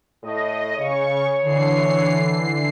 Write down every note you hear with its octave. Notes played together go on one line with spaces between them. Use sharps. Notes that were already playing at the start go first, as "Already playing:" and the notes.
A2 D#5
C#3 C#5 C#6
D3 E3 C7